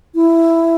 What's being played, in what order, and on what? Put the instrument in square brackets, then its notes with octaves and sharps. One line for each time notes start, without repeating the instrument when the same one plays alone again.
[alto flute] E4